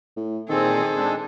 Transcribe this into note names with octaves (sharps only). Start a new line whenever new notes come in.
A2
A#2 D#3 C4 G#4 A4 C5
G#3 C4 D4